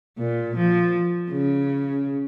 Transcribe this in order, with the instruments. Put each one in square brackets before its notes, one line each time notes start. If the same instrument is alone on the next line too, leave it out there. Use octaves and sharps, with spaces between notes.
[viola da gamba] A#2
F3
C#3